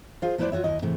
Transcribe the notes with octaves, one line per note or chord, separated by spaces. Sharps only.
F4 G#4 C5 F5
F3 A3 E4 B4 C5 D5
F4 F#4 C#5 E5
D#2 E4 D#5
G#2 C3 E3 A3